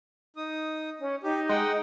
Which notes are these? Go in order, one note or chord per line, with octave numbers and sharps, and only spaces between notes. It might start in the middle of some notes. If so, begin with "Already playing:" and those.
D#4 D#6
C#4
D#4 G4
G#3 D#5 F#5 G5